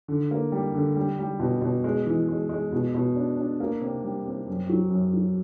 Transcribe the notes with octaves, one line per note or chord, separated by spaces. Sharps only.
D3
A#3
G3
D3
G3
G3
B2
B2
G#3
E3
G#3
G#3
B2
B2
D4
D4
A#3
C3
G3
C3
F#2
F#3
F#2
F#3